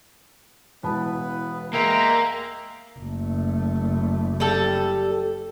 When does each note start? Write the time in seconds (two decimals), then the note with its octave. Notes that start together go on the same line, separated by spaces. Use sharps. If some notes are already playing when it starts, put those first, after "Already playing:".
0.83 E1 B3 E4 B4 A5
1.73 G#3 A#3 E5 G5 A#5
2.99 F#1 A3
4.40 G3 A4